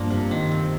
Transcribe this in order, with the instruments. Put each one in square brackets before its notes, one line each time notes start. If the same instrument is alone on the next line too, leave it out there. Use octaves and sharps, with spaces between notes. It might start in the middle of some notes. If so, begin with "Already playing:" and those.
Already playing: [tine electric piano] G2 [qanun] F3 A#3 D4
[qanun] C3
D#3
C4